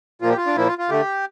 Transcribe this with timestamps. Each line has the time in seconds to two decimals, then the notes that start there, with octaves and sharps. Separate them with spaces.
0.22 A#2 F3 A#3 F4
0.30 G4
0.37 F4
0.47 D4
0.56 A#2 F3 A#3 E4
0.67 F4
0.78 F4
0.89 D3 A3 G4